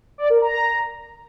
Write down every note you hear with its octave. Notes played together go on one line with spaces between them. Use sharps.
D5
A#4
A#5